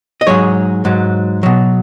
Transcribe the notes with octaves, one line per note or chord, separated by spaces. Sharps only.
D#5
G#2 F#3 G#4 C#5
G#2 F#3
B2 F#3